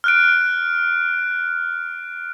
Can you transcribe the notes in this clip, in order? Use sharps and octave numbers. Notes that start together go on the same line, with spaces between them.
F6 F#6 D7